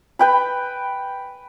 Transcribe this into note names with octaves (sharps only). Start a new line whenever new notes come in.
B4 G5 B5